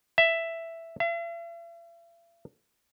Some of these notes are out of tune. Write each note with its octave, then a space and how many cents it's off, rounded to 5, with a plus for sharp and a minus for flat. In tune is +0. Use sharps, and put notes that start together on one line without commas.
E5 +5
E5 +45